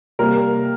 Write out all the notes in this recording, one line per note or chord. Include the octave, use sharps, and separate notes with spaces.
C3 G3 A#3 A#4